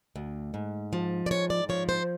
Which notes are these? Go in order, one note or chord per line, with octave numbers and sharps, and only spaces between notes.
D2
G#2
F3
D5
G#2 C#5
D5
F3 C#5
C5